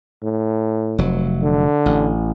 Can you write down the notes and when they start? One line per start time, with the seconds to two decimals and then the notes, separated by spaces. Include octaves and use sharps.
0.23 A2
0.98 F1 F#3
1.42 D3
1.86 A1